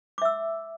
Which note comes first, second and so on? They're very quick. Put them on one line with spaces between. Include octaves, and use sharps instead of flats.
D6 E5 E6